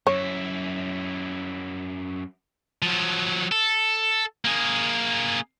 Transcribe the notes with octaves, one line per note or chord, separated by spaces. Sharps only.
F#2 E4 C#5
F3 F#3
A4
A#3 G#4